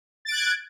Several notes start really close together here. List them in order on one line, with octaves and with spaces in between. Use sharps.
A6 D7 F#6 G#6